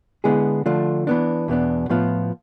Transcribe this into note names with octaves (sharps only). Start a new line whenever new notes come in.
D3 G#3 B3 E4 G#4
D3 F3 A3 D4 F4
E3 B3 D4
E2 B2 B3 D4
A2 F3 B3 F4